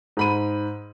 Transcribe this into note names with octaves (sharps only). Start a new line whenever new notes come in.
G#2 B5 D#7